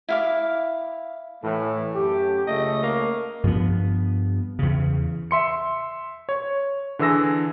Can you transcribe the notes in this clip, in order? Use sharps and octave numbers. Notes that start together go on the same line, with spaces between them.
E4 F5 D6
A2 E3 A3
F#2 G4
C#2 C#3 A3 D#5
A#3
G2 F3 B3
E2 C#3
E5 C6 C#7
C#5
D3 E3 G#4 E6 A#6